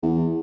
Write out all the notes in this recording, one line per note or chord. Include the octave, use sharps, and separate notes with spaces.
E2